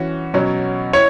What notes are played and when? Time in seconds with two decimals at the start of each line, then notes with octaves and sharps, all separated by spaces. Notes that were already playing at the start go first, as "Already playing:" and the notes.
Already playing: E3 C#4 F#4
0.34 B2 F#3 C#4
0.93 E4 C#5